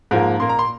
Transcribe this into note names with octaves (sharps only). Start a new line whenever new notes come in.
G#2 F3 A#3
A#2 A#3 C6
A#5
C6